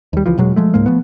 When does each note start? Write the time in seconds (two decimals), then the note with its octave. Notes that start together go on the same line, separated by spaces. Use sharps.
0.13 D#2 G3
0.26 C#2 E3 F3
0.38 E1 B2 F#3 G#3
0.56 F3 G#3 A3
0.74 C#2 G#2 G#3 A#3
0.86 F3 A3 B3